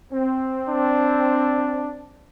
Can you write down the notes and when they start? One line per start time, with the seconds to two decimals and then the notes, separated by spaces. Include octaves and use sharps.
0.11 C4
0.69 D4